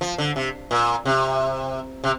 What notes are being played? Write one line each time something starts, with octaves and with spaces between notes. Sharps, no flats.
F3
D3
C3
A#2
C3
C3